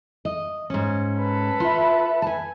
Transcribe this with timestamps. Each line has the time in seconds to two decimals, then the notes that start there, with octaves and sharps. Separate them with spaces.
0.25 D#5
0.70 G#2 C#4
1.19 A4 B4
1.60 F4 E5
2.22 G#5 A5